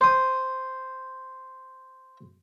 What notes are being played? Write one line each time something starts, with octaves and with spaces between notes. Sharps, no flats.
C5 D#6